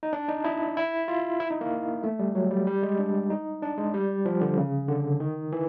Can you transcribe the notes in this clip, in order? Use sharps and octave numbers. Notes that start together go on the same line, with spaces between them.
D#4
D4
D#4
E4
E4
F4
E4
D#4
A#3
A3
G3
F#3
G3
G3
G#3
D4
D#4
D4
G#3
G3
F3
D3
C#3
D3
D#3
E3